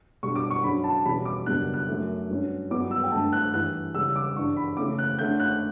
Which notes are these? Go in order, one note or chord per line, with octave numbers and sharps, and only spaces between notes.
B2 G3 D4 C#6
D6
C#6
D3 F#3 C#4 B5
A5
E2 B2 G3 C#4 B5
D6
F#2 C#3 G3 B3 D4 F#6
F#6
F#2 D3 A3
G2 F#3 C#4
G2 F#3 B3 D4 D6
E6
G5
G2 D3 A3 A5
F#6
G2 E3 G3 F#6
C#3 G3 C#4 E6
D6
G2 E3 G3 D4 C#6
B5
C#3 E3 A3 C#4 D6
F#6
D3 A3 C#4 G6
F#6